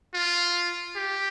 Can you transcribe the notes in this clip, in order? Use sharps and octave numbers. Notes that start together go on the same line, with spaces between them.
F4
G4